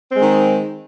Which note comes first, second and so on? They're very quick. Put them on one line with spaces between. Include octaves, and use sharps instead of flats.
C4 G#3 D#3